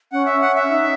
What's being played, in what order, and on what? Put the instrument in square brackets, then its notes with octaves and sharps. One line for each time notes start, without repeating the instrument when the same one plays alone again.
[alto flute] C#4 [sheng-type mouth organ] F#5
[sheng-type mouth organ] E5
F#5
E5
[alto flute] D#4